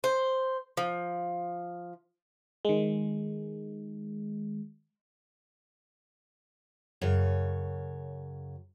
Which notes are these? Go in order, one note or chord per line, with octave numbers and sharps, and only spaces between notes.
C5
F3
D#3 G#3
F#2 C#3 C#5